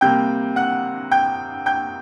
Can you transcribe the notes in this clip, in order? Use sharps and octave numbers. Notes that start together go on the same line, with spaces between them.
C3 G3 A#3 G5 G6
F#5 F#6
G5 G6
G5 G6